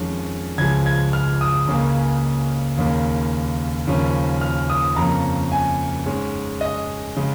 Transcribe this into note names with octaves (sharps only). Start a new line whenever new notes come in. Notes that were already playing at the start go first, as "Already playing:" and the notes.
Already playing: F2 D#3 G#3 C#4
C#2 C#3 F3 G#3 G#6
G#6
F6
D#6
C#2 C#3 A#3 C#4
D#2 C#3 A#3
D#2 C#3 F3 A#3 C#4
F6
D#6
F2 C#3 A#3 C#4 A#5
G#5
G#2 G#3 C#4
D#5
C#3 G#3